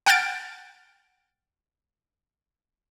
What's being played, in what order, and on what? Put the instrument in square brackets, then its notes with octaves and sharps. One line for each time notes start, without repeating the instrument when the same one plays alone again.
[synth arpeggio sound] F#5 G5 F6 G6 A6 D7